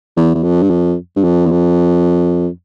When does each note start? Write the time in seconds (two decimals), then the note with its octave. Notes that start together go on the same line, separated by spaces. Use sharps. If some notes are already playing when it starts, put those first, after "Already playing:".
0.17 E2
0.35 E2
0.43 F2
0.62 G2
0.70 F2
1.16 G2
1.24 F2
1.46 E2
1.51 F2